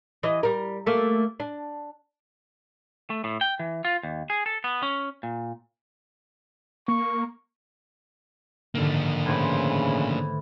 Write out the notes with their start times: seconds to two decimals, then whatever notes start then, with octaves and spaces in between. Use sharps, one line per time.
0.23 E3 D#5
0.43 G3 A#4
0.86 A3 A#3
1.40 D4
3.10 A3
3.24 A2
3.41 G5
3.59 E3
3.85 F4
4.03 D#2
4.30 G#4
4.46 A4
4.64 B3
4.83 C#4
5.23 A#2
6.88 A#3 C#6
8.75 G#2 D3 D#3 A#3 D4
9.26 A2 C#3 E3 C5